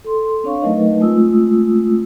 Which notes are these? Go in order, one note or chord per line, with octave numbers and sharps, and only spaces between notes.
A4 C6
C4 D4 C#5 F5 C#6
F#3 A3 D#4 A#4 B4 D#5
G#3 A3 C4 F4 D#6 E6